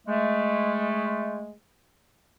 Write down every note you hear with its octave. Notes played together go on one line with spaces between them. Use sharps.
G#3 A3